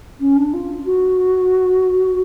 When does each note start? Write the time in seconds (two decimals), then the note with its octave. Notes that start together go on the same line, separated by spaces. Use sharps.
0.20 C#4
0.36 D4
0.54 F4
0.86 F#4